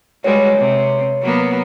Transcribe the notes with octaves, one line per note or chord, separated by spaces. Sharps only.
G3 G#3 F#4 B4 C#5
C3
F#3 A#3 B3